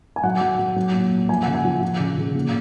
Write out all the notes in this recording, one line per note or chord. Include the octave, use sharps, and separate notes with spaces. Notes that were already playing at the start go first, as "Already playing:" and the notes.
G#5
F#3 F#5
F#3
F#3
F#3
A#2
A#2
F3 G#5
C#3 F#5
G#5
F3
F3
C#3
C#3
A#2